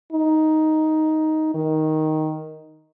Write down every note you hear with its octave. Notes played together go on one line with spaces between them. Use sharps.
D#4
D#3